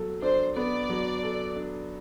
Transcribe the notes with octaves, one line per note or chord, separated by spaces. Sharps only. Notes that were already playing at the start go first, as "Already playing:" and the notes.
Already playing: F#3 B3 A4
D4 C5
B3 D5
F#3
A4
D4